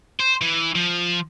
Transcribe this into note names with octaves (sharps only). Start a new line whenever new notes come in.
C5
E3
F3